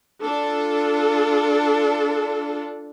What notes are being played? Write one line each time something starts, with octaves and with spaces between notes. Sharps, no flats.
D4 F4 A4